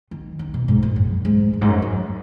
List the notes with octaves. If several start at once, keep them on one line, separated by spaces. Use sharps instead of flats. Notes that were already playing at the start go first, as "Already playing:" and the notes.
D#3
D#3
B2
G#2
A#2
F#2
G#2
F#2
G#2
F#2
F#2